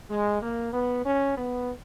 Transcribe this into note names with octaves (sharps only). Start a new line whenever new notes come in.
G#3
A#3
B3
C#4
B3